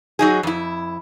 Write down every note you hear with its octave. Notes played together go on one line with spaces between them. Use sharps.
F#3 D#4 G#4
F2 E4